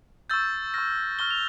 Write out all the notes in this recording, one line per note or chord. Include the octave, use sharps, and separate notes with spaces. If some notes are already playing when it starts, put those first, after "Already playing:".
C#6 E6 G6 A6
C#6 F6 A#6
C#6 F6 G7
F7